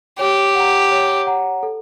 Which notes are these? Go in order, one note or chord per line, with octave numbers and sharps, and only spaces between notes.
G4 C#5
F#5 A#5
C#5
F#5 A#5
A4